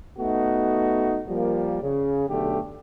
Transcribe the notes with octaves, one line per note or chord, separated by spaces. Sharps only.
A3 B3 D#4 F#4
F3 G3 A#3
C#3
B1 D3 A3 G4